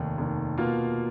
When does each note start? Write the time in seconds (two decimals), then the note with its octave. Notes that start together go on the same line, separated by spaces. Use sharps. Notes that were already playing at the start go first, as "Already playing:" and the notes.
Already playing: F1 D#2 D#3
0.18 F1 D#2 D#3
0.58 B2 A#3 F4